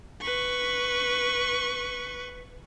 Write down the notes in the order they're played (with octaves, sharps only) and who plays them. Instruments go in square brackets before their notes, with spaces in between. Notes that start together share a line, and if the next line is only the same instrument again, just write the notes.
[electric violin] B4 C#6